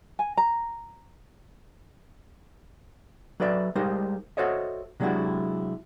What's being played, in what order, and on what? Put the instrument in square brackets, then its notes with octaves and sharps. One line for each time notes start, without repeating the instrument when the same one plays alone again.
[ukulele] G#5
A#5
[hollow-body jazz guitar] F#3 A4 B4 D5 E5
G3 G#3 D#4 A#4 C5
F#4 A4 C5 C#5 D#5 E5
C3 F#3 G#3 D4 E4 F#4